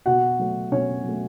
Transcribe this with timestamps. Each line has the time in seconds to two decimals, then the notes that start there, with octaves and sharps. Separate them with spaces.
0.06 B2 F#4 F#5
0.39 F#3 A3
0.72 B2 C#4 C#5
1.04 F#3 A3